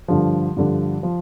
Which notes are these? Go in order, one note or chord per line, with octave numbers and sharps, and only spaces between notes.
G2 D3 F3
G2 D3 F3
F3